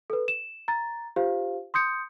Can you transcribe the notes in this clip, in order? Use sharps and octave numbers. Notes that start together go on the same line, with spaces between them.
A4 B4
E7
A#5 A6
F4 G4 C5 F5
C6 D#6 G6 C#7